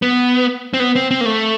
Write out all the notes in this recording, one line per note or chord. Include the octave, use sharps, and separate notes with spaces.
B3
C4
B3
C4
C4
A#3
A3